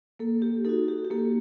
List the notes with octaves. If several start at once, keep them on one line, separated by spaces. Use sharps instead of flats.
A#3 A4
G4
D#4 F#4 A4
G4
G4
A#3 A4